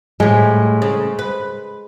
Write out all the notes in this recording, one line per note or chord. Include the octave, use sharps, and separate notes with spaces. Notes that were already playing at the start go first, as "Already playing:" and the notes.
A2 G3 G#3
C#3
B4